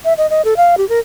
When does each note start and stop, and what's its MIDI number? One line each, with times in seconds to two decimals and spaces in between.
0.05 0.13 76
0.18 0.29 75
0.30 0.42 75
0.45 0.54 69
0.57 0.75 77
0.77 0.87 67
0.89 0.99 70